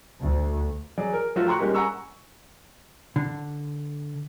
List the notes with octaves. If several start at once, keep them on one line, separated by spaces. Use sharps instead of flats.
D2
F#3 G#4 D5
A#4
F3 F#3 A3 F4 F#4
G5 A#5 C6 C#6 F#6
G3 G#3 A#3 C#4 D#4 G4
F#5 G#5 A#5 C#6 E6
D3